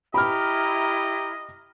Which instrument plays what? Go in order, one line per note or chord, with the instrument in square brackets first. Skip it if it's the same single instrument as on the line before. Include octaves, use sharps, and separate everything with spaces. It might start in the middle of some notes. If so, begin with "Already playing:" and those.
[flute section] E4 A#5 [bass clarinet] G4 [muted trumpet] D#5 [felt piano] B5 F6